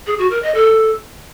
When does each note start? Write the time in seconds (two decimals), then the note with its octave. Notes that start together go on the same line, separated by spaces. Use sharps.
0.07 G#4
0.19 F#4
0.31 A#4
0.43 D#5
0.55 A4